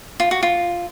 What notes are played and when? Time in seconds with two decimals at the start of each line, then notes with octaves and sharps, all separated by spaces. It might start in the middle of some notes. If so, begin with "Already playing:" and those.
0.20 F4
0.31 F#4
0.43 F4